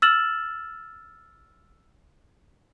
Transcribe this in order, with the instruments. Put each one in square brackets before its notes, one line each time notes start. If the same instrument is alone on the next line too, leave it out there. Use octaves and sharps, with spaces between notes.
[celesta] E6 F6 A6 E7 F#7